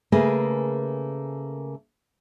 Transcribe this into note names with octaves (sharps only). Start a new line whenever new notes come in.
C#3 A3 A#3 G#4 A#4 B4